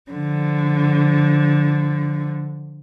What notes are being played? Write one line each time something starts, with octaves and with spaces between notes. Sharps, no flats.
D3 F3